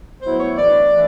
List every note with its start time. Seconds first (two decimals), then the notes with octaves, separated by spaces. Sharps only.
0.22 A2 F#3 B3 E4 C5
0.39 C#5
0.57 E3 A3 D4 D5
0.91 E3 A3 D4